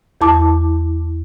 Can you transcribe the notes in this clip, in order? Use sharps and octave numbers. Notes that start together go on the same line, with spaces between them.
E2 E4 A5 D6